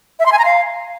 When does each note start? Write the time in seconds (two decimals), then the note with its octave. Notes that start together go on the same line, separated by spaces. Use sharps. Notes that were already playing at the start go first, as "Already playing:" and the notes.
0.20 E5
0.26 C6
0.32 G#5
0.39 A#5
0.45 F5